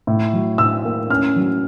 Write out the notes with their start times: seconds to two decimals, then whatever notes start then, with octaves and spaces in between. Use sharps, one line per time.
0.07 A2
0.33 F#3
0.58 A2 E6
0.85 A#3
1.09 C#4 F6
1.36 F#3